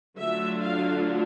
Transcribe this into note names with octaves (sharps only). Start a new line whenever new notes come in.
D3 F#3 A3 D4 F4 E5
F5